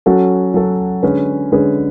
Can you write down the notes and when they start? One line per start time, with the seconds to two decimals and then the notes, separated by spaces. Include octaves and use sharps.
0.06 F#3 C#4 F#4 A4
0.54 F#3 C#4 F#4 A4
1.03 D3 G#3 C#4 G#4 B4
1.52 D3 G#3 C#4 G#4 B4